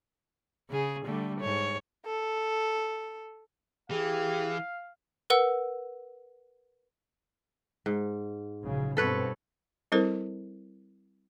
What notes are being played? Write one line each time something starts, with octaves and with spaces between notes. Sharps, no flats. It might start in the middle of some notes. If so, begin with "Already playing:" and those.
C#3 G#4
D3 G3 A3
G#2 C#5
A4
E3 G4 G#4 F5
A#4 B4 F#5 E6
G#2
A#1 C#3 F#3
G2 B2 C4 A4 B4 C#5
G3 C4 E4 A4 A#4 C5